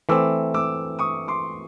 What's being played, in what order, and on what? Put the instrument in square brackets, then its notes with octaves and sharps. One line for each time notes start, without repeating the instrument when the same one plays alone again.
[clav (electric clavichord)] E3 A3 C4 [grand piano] D6 E6
[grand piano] D6 E6
C#6 D#6
C6 D6